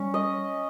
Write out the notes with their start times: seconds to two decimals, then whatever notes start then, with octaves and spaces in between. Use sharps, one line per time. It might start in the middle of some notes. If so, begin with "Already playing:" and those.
Already playing: G3 C#4
0.14 D#5